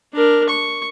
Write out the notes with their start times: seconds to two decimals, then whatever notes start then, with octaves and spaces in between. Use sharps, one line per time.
0.14 D4 A#4
0.49 C#6